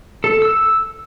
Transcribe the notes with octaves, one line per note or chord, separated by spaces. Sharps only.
A4
E6